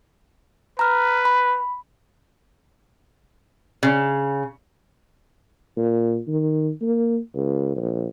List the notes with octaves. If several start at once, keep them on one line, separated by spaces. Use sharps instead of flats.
B4 A#5 F6
B5
C#3
A#2
D#3
A#3
C#2
A#1